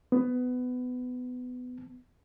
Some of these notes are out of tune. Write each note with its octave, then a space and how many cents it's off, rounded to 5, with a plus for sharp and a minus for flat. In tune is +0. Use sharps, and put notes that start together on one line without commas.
B3 +20